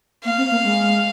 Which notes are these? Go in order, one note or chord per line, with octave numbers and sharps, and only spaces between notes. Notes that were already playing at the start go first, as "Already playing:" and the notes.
A#3 F5
C4
A#3
G#3